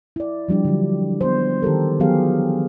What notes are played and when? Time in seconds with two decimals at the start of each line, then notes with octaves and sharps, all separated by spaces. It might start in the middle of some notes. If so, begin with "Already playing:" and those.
0.16 E4 D5
0.48 F3 G3 D4 G4
0.65 D3 F#3
1.21 B3 C5
1.62 D#3 G4 A4 A#4
2.00 E3 F#3 B3 G4 G#4 F5